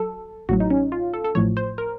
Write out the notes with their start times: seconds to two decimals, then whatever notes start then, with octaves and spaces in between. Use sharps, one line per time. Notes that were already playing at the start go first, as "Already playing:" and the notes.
Already playing: F#3 A4
0.49 A1 A2 F#3 F#4
0.60 D#4
0.70 C#4
0.92 F4
1.14 A4
1.25 A4
1.35 A1 A2 F3 C#5
1.57 C5
1.78 A#4